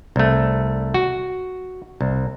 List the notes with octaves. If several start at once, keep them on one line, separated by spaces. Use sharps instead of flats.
C2 A3
F#4
C2